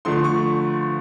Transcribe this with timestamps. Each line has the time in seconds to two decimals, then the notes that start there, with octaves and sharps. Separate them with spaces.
0.05 D3 F3 A3 C6
0.24 C#6